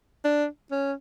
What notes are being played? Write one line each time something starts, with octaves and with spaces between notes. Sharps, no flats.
D4
C#4